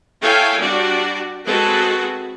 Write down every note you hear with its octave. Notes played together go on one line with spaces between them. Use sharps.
E4 A4 C#5 F5 G5 G#5
G3 D4 F#4 D5
G#3 C4 F#4 G#4 A4 B4